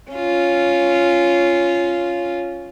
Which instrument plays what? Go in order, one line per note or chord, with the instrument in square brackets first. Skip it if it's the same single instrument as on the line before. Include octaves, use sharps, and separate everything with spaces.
[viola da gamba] C#4 F4